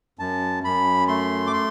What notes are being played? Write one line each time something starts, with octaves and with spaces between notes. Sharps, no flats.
F#2 A5
F#2 B5
A3 C6
D6
C6